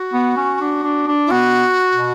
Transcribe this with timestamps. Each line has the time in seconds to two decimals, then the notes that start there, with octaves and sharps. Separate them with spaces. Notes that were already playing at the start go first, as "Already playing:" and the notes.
Already playing: F#4
0.13 B3
0.37 C#4
0.61 D4
0.84 D4
1.08 D4
1.27 E4
1.31 B3 F#4
1.94 B2